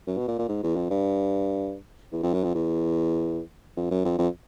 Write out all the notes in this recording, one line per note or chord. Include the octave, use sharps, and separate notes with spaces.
F#2
B2
A#2
A#2
G#2
E2
F2
G2
E2
F2
F#2
F2
E2
F2
F#2
F2
F2